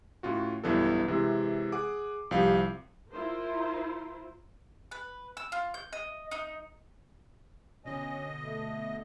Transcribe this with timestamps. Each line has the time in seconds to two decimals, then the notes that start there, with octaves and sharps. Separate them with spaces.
0.23 A2 C#4 F4 F#4
0.64 B1 G2 E3 B3 D4 A4
1.08 C3 E3 G#3 C4
1.72 G#4 F#5 D6
2.31 C2 F3 G4 F5
3.11 E4 F4 A#4 C5
4.91 B4
5.37 E6
5.52 F4
5.74 G6
5.93 D#5
6.31 D#4
7.85 B2 D3 C#4 D#5
8.44 A3